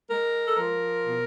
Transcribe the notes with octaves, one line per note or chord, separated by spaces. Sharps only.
G#3 A#4
A4
F3 A#4
B2